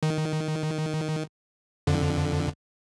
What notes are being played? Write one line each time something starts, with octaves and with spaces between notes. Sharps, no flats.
D#3
F2 D3